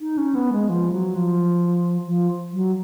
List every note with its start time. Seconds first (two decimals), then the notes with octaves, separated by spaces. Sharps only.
0.01 D#4
0.18 C#4
0.35 B3
0.53 G#3
0.69 F3
0.92 F#3
1.15 F3
2.07 F3
2.53 F#3